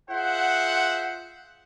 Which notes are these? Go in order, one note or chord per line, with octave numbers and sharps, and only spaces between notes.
F4 G#4 C5 E5 F#5